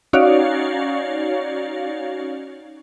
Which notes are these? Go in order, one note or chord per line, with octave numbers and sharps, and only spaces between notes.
C#4 D#4 F#4 C#5 D5 F5